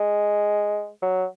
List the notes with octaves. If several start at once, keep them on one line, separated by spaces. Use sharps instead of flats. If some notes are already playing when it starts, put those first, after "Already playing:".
Already playing: G#3
F#3